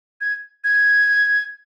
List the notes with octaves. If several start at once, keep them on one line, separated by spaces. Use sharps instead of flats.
G#6
G#6